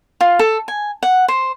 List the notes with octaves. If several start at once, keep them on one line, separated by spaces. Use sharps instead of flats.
F4
A4
G#5
F#5
C5